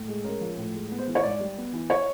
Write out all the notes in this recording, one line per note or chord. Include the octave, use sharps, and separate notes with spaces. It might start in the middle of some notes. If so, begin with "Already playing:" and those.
Already playing: A2
G#3
C#4 A#4
F3
A2
G#3
B3
C5
E3
C#5
G#2 D5
G3
B3
E3
C#5